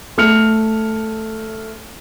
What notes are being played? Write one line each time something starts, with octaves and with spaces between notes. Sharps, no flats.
A3 F6 C#7 F7